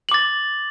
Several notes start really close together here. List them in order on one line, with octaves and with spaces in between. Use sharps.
F#7 D6 A6